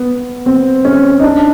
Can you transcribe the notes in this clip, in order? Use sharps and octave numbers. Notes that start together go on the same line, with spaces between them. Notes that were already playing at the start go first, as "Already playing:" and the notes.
Already playing: B3
C4
C#4
D#4
D4